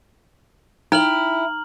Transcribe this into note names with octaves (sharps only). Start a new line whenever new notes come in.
D#4 E4 G5 A#5 F6 F#7